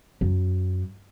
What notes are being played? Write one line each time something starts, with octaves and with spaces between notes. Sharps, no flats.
F#2